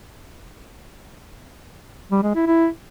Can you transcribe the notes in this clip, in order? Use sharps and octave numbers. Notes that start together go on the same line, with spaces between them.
G3
G#3
E4
E4